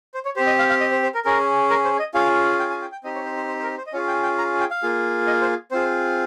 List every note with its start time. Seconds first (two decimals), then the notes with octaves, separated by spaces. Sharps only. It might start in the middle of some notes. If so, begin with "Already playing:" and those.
0.14 C5
0.25 C#5
0.36 G4 C5
0.40 C4
0.47 D#5
0.59 F5
0.70 F5
0.81 D#5
0.92 C5
1.03 C5
1.15 A#4
1.25 C#4 G#4 A#4
1.70 A#4
1.85 C5
1.99 D#5
2.14 C#4 F4 G#4 F5
2.59 G5
2.70 G#5
2.82 G5
2.92 G5
3.04 C4 D#4 G4 D#5
3.15 C#5
3.26 C5
3.37 C5
3.48 C5
3.59 C5
3.63 A#4
3.78 C5
3.87 D#5
3.93 C#4 F4 G#4 C#5
4.08 G5
4.23 G5
4.38 A#5
4.60 G5
4.71 F5
4.83 A#3 F4 G#4
5.27 D#5
5.42 C5
5.71 C4 F4 G#4 C5